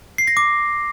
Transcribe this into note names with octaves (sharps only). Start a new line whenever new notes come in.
C7
A#6
D6